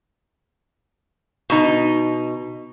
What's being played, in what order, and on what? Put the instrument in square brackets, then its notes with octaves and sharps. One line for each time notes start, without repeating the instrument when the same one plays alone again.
[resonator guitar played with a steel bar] B2 D#4